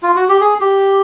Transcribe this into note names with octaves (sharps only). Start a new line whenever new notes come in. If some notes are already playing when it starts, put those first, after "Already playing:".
F4
F#4
G4
G#4
G4